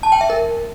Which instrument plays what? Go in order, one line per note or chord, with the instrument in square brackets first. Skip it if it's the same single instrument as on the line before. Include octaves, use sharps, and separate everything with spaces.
[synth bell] A5
G5
E5
A#4